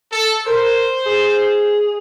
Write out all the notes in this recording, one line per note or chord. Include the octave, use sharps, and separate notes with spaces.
A4
A#4 C5
G#4